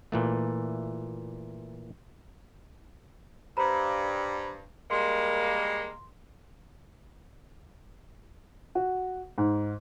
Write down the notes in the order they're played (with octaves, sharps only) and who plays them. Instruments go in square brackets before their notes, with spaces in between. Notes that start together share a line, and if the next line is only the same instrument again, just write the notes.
[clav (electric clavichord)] A#2 E3 A3
[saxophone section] G2 [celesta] C5 A#5 B5
[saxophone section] G3 G#3 A#3 [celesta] C6
[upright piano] F#4
G#2